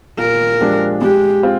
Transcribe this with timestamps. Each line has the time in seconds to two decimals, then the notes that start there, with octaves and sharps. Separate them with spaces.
0.18 A#2 A#4
0.61 F3 G#3 D4 G4
1.01 G#3 G4
1.43 C4 F4